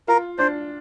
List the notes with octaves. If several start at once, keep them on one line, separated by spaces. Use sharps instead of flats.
F4 A#4
D4 C5